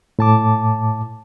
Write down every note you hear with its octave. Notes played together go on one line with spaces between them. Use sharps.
A2 A5 D6